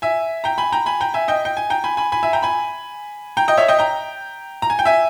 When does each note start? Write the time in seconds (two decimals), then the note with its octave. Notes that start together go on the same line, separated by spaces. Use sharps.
0.02 E5 G#5
0.44 G5 A#5
0.58 G#5 B5
0.72 G5 A#5
0.86 G#5 B5
1.01 G5 A#5
1.14 E5 G#5
1.28 D#5 G5
1.45 G5
1.57 G#5
1.70 G5 A#5
1.84 G#5 B5
1.97 G#5 B5
2.12 G#5 B5
2.23 E5 G#5
2.33 G5 A#5
2.43 G#5 B5
3.37 G5 A#5
3.48 D#5 G5
3.57 C#5 E5
3.68 D#5 G5
3.79 G5 A#5
4.62 A#5
4.70 G#5
4.79 G5
4.85 E5 G#5